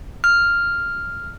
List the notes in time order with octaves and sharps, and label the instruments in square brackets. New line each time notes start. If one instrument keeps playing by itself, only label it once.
[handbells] F6